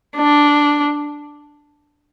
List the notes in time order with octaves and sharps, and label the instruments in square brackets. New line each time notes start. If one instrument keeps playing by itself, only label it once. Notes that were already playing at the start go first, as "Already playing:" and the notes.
[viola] D4